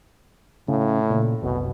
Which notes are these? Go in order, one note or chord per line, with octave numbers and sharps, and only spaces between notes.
A2 C#3
A#2 C#3
F#1 C2 B2